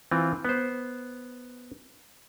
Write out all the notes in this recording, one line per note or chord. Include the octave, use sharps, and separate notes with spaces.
E3 C4 F4
B3 C5